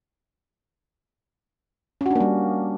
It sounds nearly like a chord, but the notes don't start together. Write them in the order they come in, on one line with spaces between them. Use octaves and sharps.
C#4 F#4 D4 A#3 G3